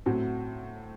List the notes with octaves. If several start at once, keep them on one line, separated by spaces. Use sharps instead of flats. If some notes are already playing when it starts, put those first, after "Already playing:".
A2 F#3 C4 F#4